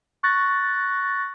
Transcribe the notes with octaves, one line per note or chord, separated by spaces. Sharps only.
C#6 F#6 A6 A#6